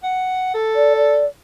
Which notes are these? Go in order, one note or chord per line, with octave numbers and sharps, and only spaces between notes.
F#5
A4
D5
D5